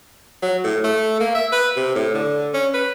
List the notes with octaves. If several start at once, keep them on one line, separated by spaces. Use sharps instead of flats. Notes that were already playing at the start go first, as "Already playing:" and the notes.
F#3
A2
A3
A#3
E5
B4
C3
A2
D3
C#4
B4